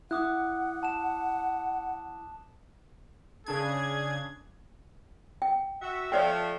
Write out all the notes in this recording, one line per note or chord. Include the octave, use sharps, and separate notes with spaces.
E4 F#5 D6 D#6 F#6
A5 E7
C#3 D4 G#4 G#6
G5
F#4 E5
F3 A3 C#5 D5 G5